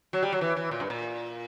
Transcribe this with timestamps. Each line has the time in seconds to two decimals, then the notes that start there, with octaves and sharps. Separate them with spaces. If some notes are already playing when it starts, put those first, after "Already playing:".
0.13 F#3
0.23 G3
0.33 F#3
0.41 E3
0.56 E3
0.71 A#2
0.80 G2
0.90 A#2